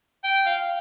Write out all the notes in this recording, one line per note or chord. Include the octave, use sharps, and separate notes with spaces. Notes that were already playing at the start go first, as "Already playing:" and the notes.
G5
F5